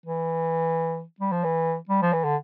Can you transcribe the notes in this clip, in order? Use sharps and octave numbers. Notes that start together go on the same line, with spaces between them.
E3
G3
F3
E3
G3
F3
E3
D3